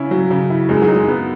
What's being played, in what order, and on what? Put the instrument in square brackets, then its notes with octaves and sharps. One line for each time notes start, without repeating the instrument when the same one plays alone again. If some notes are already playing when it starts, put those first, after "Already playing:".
Already playing: [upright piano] C#3 C#4 E4
F#3
C#3
E4
[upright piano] F#2 [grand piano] G#3
[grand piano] F#3
[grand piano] G#3 [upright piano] D#4
[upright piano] B3